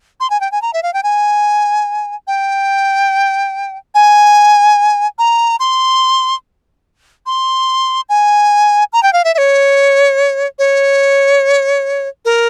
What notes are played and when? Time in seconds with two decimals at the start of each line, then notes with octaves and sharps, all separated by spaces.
0.20 C6
0.30 G#5
0.41 G5
0.52 G#5
0.62 A#5
0.73 E5
0.83 F5
0.94 G5
1.03 G#5
2.27 G5
3.95 G#5
5.19 A#5
5.60 C6
7.26 C6
8.09 G#5
8.93 A#5
9.03 G5
9.13 F5
9.24 E5
9.35 E5
9.38 C#5
10.59 C#5
12.25 A#4